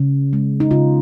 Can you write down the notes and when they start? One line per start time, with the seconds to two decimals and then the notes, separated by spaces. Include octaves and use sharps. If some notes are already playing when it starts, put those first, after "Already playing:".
Already playing: C#3 C#4
0.33 G#3
0.60 D#4
0.71 C#3 F4